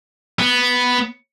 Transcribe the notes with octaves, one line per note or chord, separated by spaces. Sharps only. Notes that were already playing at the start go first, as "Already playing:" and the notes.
B3